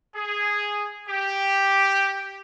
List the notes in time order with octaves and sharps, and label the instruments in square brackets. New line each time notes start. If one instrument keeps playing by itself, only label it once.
[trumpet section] G#4
G4